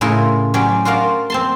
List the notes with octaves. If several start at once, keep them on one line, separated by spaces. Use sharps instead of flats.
A2 C#3 E4 F4 A4 A#4
F#3 C#4 G4 C5 D5
F4 F#4 A#4 D5 F5
C4 A5 C6